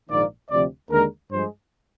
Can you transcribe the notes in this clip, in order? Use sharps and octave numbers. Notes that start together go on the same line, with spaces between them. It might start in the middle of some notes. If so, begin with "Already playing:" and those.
A#1 G#2 D#3 A#3 D5
D2 C3 F3 D5
D#2 D3 G#3 A#4
G2 F3 G#3 C5